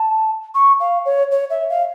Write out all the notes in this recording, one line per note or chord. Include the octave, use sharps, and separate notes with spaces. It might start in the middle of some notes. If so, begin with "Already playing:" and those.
Already playing: A5
C#6
F5
C#5
C#5
E5
F5